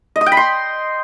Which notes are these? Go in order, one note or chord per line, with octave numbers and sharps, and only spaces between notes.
D#5
D#6
G5
B5
C6